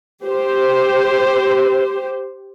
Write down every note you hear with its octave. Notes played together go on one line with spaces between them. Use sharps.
G4 C5